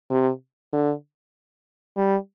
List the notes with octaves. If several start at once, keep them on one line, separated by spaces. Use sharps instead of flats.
C3
D3
G3